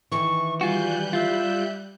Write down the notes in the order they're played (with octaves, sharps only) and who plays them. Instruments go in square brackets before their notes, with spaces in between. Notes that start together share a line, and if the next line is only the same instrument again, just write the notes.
[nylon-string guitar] D#3 E3 [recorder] C#6
[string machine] G3 F#6 G6 [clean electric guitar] F4 F#4 [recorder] G#5
[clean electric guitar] F4 [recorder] E5